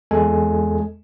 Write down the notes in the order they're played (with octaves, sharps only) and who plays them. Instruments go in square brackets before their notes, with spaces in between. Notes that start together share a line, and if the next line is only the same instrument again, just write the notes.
[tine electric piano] E2 G#3 A4 G#5